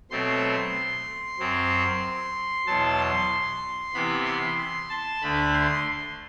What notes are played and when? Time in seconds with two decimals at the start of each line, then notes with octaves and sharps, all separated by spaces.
0.10 B2 F#3 A3 C4 C6
1.39 F#2 F#3 C4
2.66 E2 B2 F#3 A5
2.98 C6
3.94 C3 E3 B3 B5
4.26 C6
4.58 C6
4.89 A5
5.22 D2 D3 A3 B5
5.54 C6